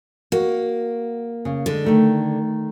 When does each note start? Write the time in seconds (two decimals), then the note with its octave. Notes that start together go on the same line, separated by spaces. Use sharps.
0.32 A#3 F#4
1.45 C#3
1.66 D3 G#3
1.85 D#3 A3 D#4